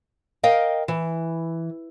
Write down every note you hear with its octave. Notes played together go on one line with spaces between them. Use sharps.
A#4 D#5 F5 G5
E3